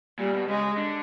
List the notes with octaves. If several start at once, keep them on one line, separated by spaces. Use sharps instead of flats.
A#2 G3
B2
C#3 G#3
D3